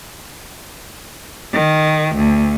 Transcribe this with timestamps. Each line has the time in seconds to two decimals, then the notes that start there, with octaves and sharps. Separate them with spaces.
1.53 D#3
2.16 D2